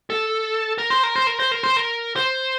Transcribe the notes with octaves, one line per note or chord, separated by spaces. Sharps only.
A4
A#4
C5
A#4
C5
A#4
C5
A#4
C5
A#4
C5